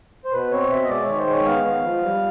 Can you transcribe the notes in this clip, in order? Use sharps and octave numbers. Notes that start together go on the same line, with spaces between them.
C5
B2 B4
C4 C#5
B2 E5
D#5
G#3 D5
D#3 C#5
C5
G#3
C#5
B3 F5
B3
F3
G3